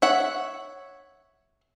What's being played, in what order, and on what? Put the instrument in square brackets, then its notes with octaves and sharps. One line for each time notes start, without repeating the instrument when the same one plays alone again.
[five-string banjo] C#5 E5 F#5